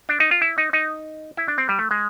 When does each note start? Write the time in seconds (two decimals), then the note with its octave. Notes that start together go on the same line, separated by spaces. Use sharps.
0.09 D4
0.20 D#4
0.31 F4
0.42 E4
0.58 D#4
0.73 D#4
1.37 E4
1.48 D4
1.58 C4
1.69 G3
1.79 A3
1.91 G#3